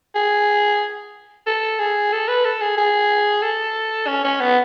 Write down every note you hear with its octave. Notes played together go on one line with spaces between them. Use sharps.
G#4
A4
G#4
A4
B4
A4
G#4
G#4
A4
C#4
C#4
B3